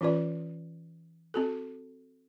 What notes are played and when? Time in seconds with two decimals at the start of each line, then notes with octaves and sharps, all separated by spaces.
0.01 E3 C#4 F4 B4 D5
1.34 C4 F#4 A4